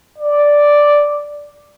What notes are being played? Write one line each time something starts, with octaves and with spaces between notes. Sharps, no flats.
D5